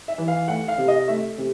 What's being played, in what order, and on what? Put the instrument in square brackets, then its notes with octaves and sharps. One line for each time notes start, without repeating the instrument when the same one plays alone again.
[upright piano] E5
E3
F5
A3 F#5
F5
C3
D#5
A3 E5
C3